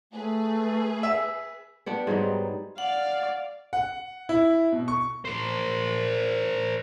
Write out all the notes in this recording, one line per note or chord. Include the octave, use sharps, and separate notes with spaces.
A3 G#4 B4
E5
B3 D4 G4
G#2 F#3 G3 D#4
D5 F5 F#5
F#5
E4
B2
C#6
A#4 C5